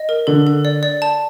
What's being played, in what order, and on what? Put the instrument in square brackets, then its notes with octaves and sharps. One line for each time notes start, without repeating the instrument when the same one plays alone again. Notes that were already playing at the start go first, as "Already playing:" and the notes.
Already playing: [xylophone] D#5
A#4
[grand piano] D3 [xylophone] A4
[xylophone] A4
D5
D5
A5